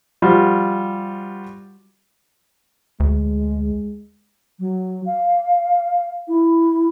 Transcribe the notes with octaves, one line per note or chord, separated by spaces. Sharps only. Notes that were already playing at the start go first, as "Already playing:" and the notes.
F3 G3 F4 F#4
D2 G#3
F#3
F5
E4